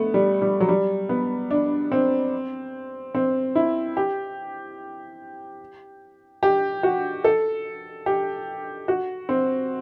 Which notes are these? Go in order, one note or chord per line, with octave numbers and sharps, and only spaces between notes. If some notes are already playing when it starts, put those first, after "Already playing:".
Already playing: A3 B3
G3
G3
F#3
G3
B3
D4
C4
C4
E4
G4
G4
F#4
A4
G4
F#4
C4